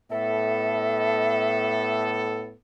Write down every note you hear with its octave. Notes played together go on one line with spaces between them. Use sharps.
A2 B3 A4 E5